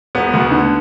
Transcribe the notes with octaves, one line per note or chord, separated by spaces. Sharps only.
E1 B3
D2
D3